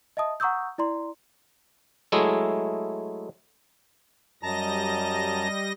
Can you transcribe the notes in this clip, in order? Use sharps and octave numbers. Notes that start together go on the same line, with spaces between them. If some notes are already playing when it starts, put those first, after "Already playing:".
D#5 E5 A5 D#6
F#5 A#5 C#6 D#6 E6 G6
E4 D5 A#5 C6
F#3 G#3 A3 E4 G#4
F#2 G3 D#5 A5 A#5 A#6